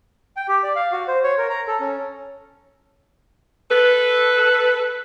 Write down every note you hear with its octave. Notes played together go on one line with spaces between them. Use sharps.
G5
G4
D5
F5
F#4
C5
C#5
A#4
A#5
A4
C#4
A4 B4